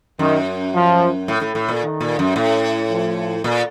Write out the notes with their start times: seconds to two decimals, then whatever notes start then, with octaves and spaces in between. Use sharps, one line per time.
0.19 F#2 D#3
0.74 F3
1.28 A2
1.41 A2
1.55 A2
1.69 A#2
1.83 D#3
2.01 A#2
2.19 F#2
2.36 A2
2.90 F3
3.44 A#2